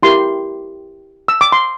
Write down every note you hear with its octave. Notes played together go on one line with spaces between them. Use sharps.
E4 G4 A#4 C6
E6
D6
C6